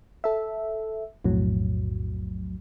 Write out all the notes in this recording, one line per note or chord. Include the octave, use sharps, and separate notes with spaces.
A4 E5
B1 F2 A2 F#3